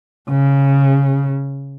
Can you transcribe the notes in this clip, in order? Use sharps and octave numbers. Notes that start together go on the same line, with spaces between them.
C#3